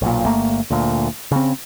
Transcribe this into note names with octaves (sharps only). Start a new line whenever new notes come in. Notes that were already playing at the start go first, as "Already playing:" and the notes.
B1 A#2
G1 A3 A#3
D2 A#2
C#3 C4